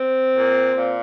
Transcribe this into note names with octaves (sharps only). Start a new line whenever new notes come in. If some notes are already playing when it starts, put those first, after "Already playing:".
Already playing: C4
A#2
A#2